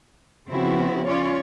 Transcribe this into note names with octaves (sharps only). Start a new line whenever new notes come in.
C#3 F3 B3 C4 E4 F#4
C#4 F4 C#5 D5